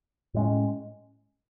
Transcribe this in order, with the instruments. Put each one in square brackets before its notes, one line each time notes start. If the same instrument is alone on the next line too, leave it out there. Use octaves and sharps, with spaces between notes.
[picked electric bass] A2 G#3 C#4